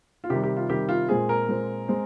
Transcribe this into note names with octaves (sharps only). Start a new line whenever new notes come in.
F4
C3 D#3 G3 G4
G4
F4
C3 D#3 G3 G4
F4
A#2 G#3 C4 G#4
A#4
A#2 G#3 C4
G#3 C4